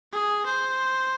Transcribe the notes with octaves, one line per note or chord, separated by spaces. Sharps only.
G#4
C5